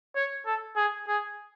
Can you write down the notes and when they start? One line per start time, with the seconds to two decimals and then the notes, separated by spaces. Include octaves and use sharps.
0.16 C#5
0.46 A4
0.76 G#4
1.08 G#4